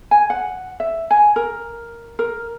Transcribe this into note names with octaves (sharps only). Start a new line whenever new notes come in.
G#5
F#5
E5
G#5
A#4
A#4